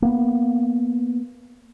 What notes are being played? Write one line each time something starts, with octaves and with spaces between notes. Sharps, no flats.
A#3 B3